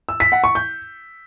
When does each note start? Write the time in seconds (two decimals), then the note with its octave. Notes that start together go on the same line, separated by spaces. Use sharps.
0.09 E6
0.20 B6
0.32 F#5
0.44 C#6
0.55 G6